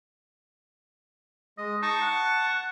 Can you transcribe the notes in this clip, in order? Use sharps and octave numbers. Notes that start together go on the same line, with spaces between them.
G#3 D#5
D#4 A5 C#6
F#5